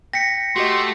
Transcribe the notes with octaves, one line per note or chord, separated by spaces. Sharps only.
G5 A#6 B6 C#7
A3 F#4 G4 D#5 C6